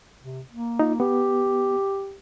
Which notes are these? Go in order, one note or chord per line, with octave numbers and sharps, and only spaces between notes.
C3
A#3
D#4 F4
B3 G4